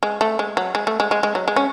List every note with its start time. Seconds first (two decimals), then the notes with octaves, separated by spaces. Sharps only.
0.03 G#3
0.21 A3
0.39 G#3
0.57 F#3
0.75 G#3
0.87 A3
1.00 G#3
1.11 G#3
1.23 G#3
1.35 F#3
1.48 G#3
1.56 C#4